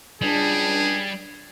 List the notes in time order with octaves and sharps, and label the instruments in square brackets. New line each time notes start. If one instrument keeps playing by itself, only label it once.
[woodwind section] C#2 D4 [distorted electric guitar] G3 [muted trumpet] G#4